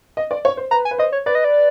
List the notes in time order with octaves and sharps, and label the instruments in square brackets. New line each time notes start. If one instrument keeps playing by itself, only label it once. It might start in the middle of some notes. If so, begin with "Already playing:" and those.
[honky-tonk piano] D#5
D5
C#5
C5
[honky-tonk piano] B4 [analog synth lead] A#5
[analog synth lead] G#5
[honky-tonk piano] B4
[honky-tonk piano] C5 [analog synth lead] D#5
[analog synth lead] C#5
[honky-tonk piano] B4 [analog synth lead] D5
[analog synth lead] D#5
D5